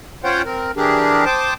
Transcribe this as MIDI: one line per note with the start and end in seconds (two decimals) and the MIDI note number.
0.24 0.42 61
0.24 0.42 65
0.24 0.42 72
0.24 0.42 73
0.24 0.42 78
0.24 0.42 79
0.45 0.71 60
0.45 0.71 70
0.77 1.25 52
0.77 1.25 62
0.77 1.25 67
0.77 1.25 68
0.77 1.25 70
1.25 1.54 72
1.25 1.54 79
1.25 1.54 81
1.25 1.54 86
1.25 1.54 87